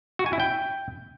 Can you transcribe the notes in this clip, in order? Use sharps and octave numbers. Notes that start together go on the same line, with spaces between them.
F#4
G#5
E4
G5